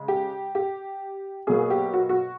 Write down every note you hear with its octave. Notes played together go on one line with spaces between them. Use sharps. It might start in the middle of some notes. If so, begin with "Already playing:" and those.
Already playing: C#3 G#3
G4
G4
B2 F#3 A#3 G#4
G4
F#4
F#4